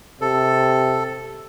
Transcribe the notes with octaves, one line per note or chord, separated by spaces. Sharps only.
C3 A4